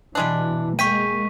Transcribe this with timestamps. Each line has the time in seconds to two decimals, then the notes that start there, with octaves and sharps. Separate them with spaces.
0.15 B2 E3 G3 G#3 D4
0.79 G#3 A#3 G5 C#6 B6 D#7